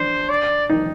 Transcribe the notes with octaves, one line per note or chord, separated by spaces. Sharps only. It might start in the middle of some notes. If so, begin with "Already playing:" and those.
Already playing: D4 C5
D5
D#4